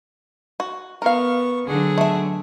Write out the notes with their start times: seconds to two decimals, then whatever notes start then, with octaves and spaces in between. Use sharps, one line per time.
0.60 F#4
1.02 B3 A#4 F5 C#6
1.67 D3 F#3 G#4 F#5
1.98 A3 E5